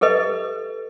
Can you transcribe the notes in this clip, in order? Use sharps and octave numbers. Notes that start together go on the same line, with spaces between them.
G4 A4 B4 D#5